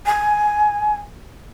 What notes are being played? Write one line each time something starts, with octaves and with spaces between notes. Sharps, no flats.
G#5